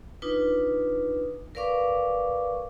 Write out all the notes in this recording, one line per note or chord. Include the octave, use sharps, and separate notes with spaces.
D4 D#4 F4 B4
A#4 B4 D5 F5 C#6 D6